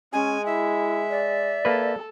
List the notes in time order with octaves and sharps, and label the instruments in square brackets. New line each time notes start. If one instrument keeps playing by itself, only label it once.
[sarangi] G#3 [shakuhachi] C#4 [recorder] G#5
[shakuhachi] E4 [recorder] E5
[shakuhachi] D5
[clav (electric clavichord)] A#3 B4 [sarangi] A4